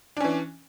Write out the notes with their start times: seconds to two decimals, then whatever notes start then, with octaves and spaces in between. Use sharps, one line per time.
0.17 D4
0.20 C#4
0.24 E3